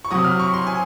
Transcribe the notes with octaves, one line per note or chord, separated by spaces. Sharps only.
C#6
C3 F#3 D#6
F6
C#6
C6
G#5